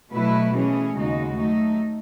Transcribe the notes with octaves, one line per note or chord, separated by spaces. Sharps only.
B2 F#3 A3 E4 B4
E3 A3 C#4 G#4
D#2 C#3 G#3 D#4 F#4
F#3 A3 D#4